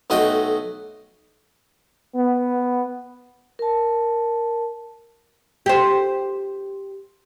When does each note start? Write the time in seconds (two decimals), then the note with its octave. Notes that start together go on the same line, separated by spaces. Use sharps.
0.10 B1 A3 F#4 D#5 F#5 G5
2.15 B3
3.59 A#4 A5
5.66 G4 C5